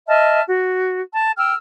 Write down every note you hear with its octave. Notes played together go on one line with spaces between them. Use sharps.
D#5 E5 A5 F6
F#4
A5
G5 E6 F6